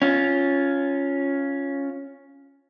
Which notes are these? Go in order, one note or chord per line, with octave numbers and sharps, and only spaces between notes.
C#4 F4